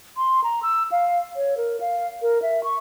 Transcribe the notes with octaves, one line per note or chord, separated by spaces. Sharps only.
C6
A#5
E6
F5
C#5
A#4
F5
A#4
E5
C#6